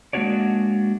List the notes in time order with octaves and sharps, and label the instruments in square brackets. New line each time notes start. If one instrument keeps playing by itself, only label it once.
[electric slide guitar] G#3 A#3 D4 F#4 C#5 D5